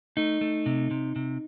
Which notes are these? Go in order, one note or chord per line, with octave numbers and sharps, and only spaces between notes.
A3 D#4
A3
C3
C3
C3